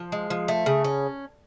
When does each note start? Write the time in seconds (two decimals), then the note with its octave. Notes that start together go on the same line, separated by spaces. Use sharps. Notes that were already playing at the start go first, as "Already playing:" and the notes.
Already playing: F3
0.12 G#3
0.30 F3
0.48 A3
0.66 C#3
0.84 C#4